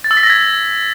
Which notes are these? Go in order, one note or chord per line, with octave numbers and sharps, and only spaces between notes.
A6
E6
B6
A#6
G#6